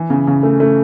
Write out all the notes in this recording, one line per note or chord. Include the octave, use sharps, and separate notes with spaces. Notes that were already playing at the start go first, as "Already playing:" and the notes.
Already playing: E3
C#3
C#3
A3
A3